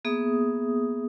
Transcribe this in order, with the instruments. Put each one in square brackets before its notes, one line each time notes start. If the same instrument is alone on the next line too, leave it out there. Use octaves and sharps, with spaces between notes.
[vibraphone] A#3 B3 G#4 E5 D#6